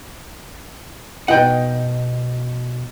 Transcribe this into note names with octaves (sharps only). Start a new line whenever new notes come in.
B2 D#4 B4 F#5 G5